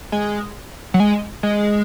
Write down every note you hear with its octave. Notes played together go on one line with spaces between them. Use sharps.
G#3
F#3
G#3
G#3